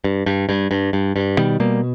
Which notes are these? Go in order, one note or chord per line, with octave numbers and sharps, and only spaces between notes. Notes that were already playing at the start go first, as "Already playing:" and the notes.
G2
G2
G2
G2
G2
G2
B2 D#3 G3
B2 G3 A#3